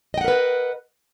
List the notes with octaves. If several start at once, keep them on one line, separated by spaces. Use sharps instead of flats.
A#4 B4 D#5 F#5 G5